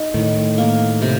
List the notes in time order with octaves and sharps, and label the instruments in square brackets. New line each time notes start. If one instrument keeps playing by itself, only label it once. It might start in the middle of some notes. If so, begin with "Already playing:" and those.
Already playing: [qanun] D#4
[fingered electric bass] A2 [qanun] D#3
[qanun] A#3
C3